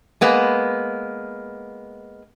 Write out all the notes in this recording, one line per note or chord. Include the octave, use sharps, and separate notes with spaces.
G#3 A#3 B3